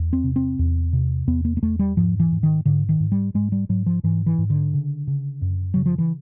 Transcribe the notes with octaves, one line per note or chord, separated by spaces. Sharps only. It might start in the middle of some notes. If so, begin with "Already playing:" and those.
Already playing: E2
C4
C3
C4
E2
C3
E2 B3
A#3
A#3
E2 A3
G3
G#2 F3
E3
G#2
D#3
G#2 D3
D#3
G#2
G3
G#2 G#3
G3
G#2 F#3
F3
G#2 E3
E3
G#2
D3
C#3
C#3
F#2
C#3 F#3
F3
E3